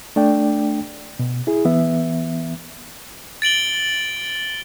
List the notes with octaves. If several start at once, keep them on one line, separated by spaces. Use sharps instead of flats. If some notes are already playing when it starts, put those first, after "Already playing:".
A3 D4 D5 G5
B2
E4 G#4
E3 B3 E5
A6 D7 F#7 G7